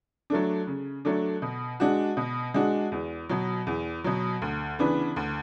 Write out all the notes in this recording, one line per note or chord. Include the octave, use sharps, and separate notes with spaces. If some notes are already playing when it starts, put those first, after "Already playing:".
F#3 A3 D4
C#3
F#3 A3 D4
B2
G#3 D4 F#4
B2
G#3 D4 F#4
E2
B2 F#3
E2
B2 F#3
D2
C#3 E3 B3 D4
D2